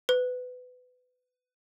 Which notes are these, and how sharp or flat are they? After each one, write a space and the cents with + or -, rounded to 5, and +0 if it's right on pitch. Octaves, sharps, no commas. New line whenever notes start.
B4 +25